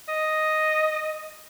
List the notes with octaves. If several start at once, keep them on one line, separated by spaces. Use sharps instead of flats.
D#5